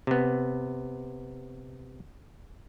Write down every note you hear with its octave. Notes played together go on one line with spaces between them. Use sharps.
C3 B3